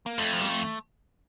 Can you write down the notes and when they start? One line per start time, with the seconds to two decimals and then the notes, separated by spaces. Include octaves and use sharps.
0.06 A#3
0.19 F2 A3
0.33 F3
0.41 G3
0.48 A3